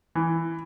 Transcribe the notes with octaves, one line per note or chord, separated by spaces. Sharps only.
E3